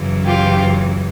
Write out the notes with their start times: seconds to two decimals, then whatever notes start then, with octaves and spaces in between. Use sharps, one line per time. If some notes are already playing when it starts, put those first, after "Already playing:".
Already playing: F#2 C#3 E3
0.26 F4 G4